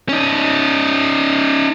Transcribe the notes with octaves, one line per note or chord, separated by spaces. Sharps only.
C#4 D#4